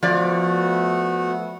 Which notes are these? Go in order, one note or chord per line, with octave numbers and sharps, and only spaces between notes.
F3 A3 B3 F#4 D5